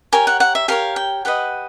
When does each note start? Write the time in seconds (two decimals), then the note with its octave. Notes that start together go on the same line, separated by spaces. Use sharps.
0.12 G4 A#4 C#5 G#5
0.27 F#5
0.40 F#5
0.55 E5
0.68 G4 A#4 C#5 F5
0.96 G5
1.25 G4 B4 D#5 F#5